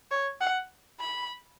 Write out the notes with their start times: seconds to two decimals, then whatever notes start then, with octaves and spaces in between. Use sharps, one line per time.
0.11 C#5
0.41 F#5
1.00 B5